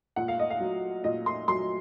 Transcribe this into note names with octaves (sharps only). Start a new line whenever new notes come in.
A#2 F#5
F5
D#5
F5
F#3
A#2 D#5
C6
F#3 C6